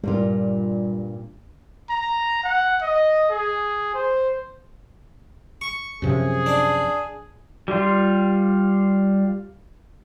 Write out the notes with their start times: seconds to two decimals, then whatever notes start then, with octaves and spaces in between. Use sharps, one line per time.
0.04 G2 A#2 G3 F4
1.90 A#5
2.44 F#5
2.82 D#5
3.30 G#4
3.94 C5
5.61 C#6
6.02 F#2 C3 F3 G#4
6.46 D4
7.68 G3 F4